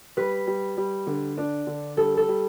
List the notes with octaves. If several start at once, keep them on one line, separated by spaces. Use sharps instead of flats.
G3 B4
G3
G3
D3
D4
D3
G3 A4
A4
G3